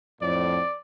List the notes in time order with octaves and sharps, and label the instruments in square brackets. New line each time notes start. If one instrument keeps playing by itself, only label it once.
[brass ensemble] F2 A2 [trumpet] D5